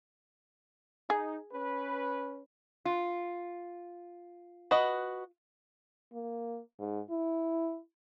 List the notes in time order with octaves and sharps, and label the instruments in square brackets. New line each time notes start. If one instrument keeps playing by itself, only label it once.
[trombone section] D#4 [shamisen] G#4
[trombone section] C#4 B4
[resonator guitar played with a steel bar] F4
[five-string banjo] F#4 B4 D#5
[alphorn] A#3
G#2
E4